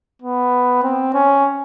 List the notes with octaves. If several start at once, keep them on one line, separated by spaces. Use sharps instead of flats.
B3
C4
C#4